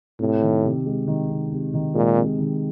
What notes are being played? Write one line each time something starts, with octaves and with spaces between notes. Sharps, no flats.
A2 C3
D#3
C3
G#3
D#3
C3
C3
D#3
A#2 G#3
C3
D#3